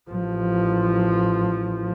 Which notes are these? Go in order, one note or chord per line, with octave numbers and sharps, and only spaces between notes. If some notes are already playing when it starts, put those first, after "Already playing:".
A1 F3